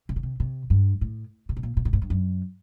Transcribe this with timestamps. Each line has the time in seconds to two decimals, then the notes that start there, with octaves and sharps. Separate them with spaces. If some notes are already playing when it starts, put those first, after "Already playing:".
0.09 C3
0.16 C#3
0.23 C3
0.40 C3
0.70 G2
1.01 A2
1.49 C3
1.57 B2
1.63 A#2
1.77 A#2
1.85 A2
1.93 G#2
2.02 G2
2.10 F#2